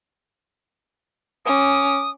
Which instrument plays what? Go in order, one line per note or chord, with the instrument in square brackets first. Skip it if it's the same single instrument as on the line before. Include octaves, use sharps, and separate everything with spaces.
[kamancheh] C#4 D6 [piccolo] D#6